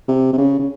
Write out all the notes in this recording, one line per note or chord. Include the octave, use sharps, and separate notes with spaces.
C3
C3
C#3
C#3